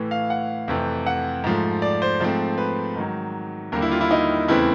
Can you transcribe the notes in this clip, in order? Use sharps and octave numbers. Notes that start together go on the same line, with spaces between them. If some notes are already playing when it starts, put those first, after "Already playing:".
Already playing: A2 E3 A3
F5
F#5
F2 C3 E3 A3
F#5
G#2 F3 A3
D5
C5
G#2 F3 A3 C4
B4
G#2 D#3 F#3
D#2 D3 G3 A#3 A#4
E4
F4
E4
D#4
E2 C#3 E3 A3 C4 E4